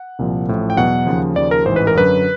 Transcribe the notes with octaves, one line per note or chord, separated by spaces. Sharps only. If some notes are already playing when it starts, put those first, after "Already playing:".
Already playing: F#5
C2 A#2 F3
A1 A2 F3
G5
E2 B2 F#3 F#5
D#2 C#3 F3
D#2 C#3 F3 D5
A#4
A1 G#2 E3 C5
B4
A#4
F#2 D3 F#3 B4